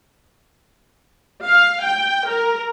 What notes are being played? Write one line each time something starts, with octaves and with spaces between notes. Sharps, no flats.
F5
G5
A#4